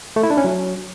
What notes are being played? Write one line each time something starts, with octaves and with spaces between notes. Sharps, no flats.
A3
E4
D4
C#4
F#3